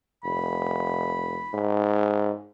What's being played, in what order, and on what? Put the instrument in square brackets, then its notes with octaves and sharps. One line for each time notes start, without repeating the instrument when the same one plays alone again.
[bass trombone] F1 [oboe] B5
[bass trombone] G#2